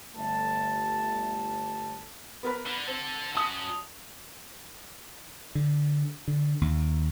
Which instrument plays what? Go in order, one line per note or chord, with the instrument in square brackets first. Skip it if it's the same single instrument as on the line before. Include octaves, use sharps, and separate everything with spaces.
[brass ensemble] G1 A3 A5
[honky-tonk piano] B3 A#4 B4
[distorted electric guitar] D3
[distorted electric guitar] D3 A4 [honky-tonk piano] C4
[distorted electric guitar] F#3 C#4 [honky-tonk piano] A5 D#6
[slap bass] D3
D3
D#2